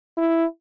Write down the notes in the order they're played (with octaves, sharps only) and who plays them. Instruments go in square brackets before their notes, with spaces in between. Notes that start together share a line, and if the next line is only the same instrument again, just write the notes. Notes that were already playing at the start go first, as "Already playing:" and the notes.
[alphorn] E4